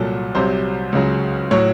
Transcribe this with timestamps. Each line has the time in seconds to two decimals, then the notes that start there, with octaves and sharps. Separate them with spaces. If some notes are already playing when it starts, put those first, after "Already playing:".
Already playing: C2 A#2 F#3 A4
0.35 C2 C3 F#3 C5
0.92 C#2 C#3 F#3
1.51 A2 F#3 C#5